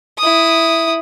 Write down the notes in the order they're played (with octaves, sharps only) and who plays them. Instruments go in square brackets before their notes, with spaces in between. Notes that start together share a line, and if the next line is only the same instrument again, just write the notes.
[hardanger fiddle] E4 D#6